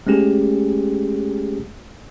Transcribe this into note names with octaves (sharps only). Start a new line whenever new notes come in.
G#3 A3 C#4 G4 G#4